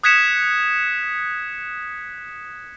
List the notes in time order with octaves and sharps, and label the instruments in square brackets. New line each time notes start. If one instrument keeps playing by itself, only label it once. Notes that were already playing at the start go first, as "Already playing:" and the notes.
[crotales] D#6 F#6 G#6 B6 C#7 E7